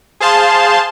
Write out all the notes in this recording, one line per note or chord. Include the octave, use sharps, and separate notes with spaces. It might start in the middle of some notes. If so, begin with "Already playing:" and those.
G#4 C5 F5 A5 C6